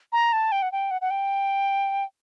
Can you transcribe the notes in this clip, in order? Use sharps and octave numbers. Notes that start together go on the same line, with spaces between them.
A#5
A5
G5
F#5
G5
F#5
F#5
G5